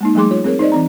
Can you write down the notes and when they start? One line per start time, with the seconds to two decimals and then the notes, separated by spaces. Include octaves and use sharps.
0.01 G#3 A#3 D#4
0.15 F3 G3 A3 G#4 C6 D6
0.30 F4 C#5
0.44 C4 G#4 A#4 C#5
0.59 D#4 C5 D5 D#5
0.72 E3 C4 A#5